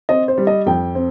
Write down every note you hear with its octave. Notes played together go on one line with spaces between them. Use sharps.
C4 D#5
C5
G3
D#5
F2 G5
C4